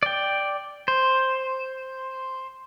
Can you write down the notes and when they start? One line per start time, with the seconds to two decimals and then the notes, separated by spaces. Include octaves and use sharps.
0.03 D5 G5
0.88 C5